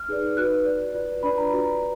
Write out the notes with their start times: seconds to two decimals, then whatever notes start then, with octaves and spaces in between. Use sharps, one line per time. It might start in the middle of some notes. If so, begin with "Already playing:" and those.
Already playing: F6
0.08 D#4 G#4 B4 D5
0.37 D#4 F#4 B4 F#6
0.65 F#4 D5
0.94 F4 B4 D5
1.23 D4 F4 B4 D5 B5
1.38 A#5
1.52 F#4 B4 D5